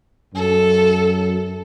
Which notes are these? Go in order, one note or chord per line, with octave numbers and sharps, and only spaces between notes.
F#2 A4